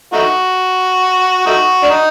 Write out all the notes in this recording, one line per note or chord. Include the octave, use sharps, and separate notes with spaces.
A3 D#4 F#4
A3 D#4 F#4
D4
D#4